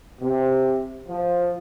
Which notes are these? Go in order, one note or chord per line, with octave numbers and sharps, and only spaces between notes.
C3
F3